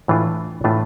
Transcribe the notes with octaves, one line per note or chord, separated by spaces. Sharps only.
A2 E3 A3 D4 F4
A2 E3 A3 D4 F4